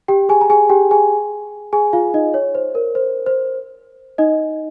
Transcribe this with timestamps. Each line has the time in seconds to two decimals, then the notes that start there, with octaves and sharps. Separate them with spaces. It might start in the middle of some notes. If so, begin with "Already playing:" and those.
0.08 G4 G5
0.29 G#4 G#5
0.41 A#5
0.50 G#4 G#5
0.69 G4 G5
0.91 G#4 G#5
1.73 G#4 G#5
1.93 F4 F5
2.14 D#4 D#5
2.34 C#5
2.55 C5
2.75 A#4
2.95 C5
3.26 C5
4.18 D#4 D#5